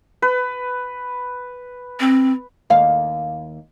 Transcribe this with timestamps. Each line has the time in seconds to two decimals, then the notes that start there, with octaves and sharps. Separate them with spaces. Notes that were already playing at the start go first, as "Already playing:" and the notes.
0.22 B4
2.00 C4
2.70 D#2 F5